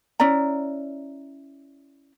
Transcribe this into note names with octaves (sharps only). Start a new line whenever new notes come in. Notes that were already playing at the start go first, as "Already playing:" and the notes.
C#4 E4 D5 A#5